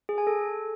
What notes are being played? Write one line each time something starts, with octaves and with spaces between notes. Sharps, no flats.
G#4
G#5
A4